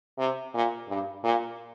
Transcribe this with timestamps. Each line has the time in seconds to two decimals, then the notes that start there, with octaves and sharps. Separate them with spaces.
0.18 C3
0.54 A#2
0.88 G2
1.23 A#2